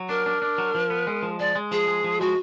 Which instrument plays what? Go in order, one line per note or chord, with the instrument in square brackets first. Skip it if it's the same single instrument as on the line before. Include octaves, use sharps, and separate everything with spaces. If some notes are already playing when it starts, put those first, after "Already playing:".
Already playing: [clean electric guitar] F#3
[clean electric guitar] D4 [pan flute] A#4
[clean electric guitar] D4
D4
F#3
F3
B3
G#3
F3
[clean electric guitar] G#3 [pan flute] D5
[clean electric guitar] G#3
[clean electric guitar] F3 [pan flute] G#4
[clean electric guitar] G#3
F3
[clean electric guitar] G#3 [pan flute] F#4